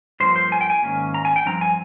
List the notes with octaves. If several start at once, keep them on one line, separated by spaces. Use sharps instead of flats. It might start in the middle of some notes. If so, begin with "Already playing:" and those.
G2 F3 A#3 C5
C5
G#5
G5
G#5
G#2 D#3 A#3 C#4
A#5
G#5
G5
G2 F3 C4 A#5
G#5